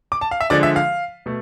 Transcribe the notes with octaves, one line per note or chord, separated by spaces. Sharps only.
D6
A5
F5
E5
D3 F3 G#3 D5
E5
F5
B2 A3